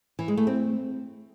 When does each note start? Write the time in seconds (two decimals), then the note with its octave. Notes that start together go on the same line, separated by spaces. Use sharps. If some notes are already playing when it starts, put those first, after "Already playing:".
0.19 E3
0.28 G#3
0.37 A3
0.47 C4